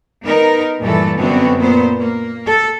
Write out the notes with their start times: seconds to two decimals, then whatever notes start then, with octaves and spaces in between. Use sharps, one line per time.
0.25 B3 D#4 A#4
0.80 G2 A#2 E3 A3 A4
1.15 F#2 D3 B3 C4 F#4
1.59 A#2 B3 C5
1.98 A#3
2.47 A4